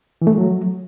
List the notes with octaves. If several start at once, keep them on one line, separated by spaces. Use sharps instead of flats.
E3
A3
G#3
F#3